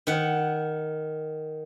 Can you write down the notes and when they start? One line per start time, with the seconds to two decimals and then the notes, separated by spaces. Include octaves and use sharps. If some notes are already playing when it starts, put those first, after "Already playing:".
0.07 D#3 F#5